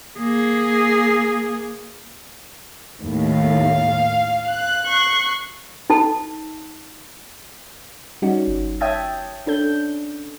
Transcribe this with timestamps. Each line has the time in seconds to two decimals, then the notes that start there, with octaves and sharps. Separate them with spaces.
0.19 A#3 G#4
3.01 D#2 A2
3.31 F5
4.49 F#6
4.86 C#6 C7
5.90 D#4 A4 A5
8.22 G3 C#4 D#4 F#4
8.47 G1
8.80 C#5 E5 G5 A5 D#6 G#6
9.47 C#4 D4 A4 G6